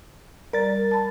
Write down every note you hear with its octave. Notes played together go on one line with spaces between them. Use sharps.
G3 A#4 D5 A6
A5 B5